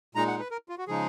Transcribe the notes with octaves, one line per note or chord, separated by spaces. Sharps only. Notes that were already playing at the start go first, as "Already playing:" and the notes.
A#2 G#3 D#4 A#5
F#5
B4
A#4
F4
F#4
C#3 F3 G#3 D#4 G#4